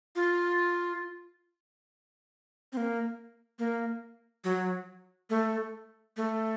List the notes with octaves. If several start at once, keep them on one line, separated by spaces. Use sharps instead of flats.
F4
C4
A#3
A#3
F#3
A3
A3